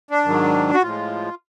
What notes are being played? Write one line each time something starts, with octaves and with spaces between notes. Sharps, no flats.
D4
G#2 D#3 F#3
F#4
A2 F3 G#3 F4